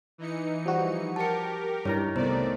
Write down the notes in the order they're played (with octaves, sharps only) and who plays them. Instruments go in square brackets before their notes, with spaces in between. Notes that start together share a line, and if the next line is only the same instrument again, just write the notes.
[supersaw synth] E3 D#4 C#7
[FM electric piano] F3 G3 F#4
[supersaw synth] G4 A#4 [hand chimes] A5 C#7
[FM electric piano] G2 A#5 [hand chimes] D#4 E4 C#5
[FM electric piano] C2 [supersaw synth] D#3 A3 D5 [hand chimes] B3 C5 A#5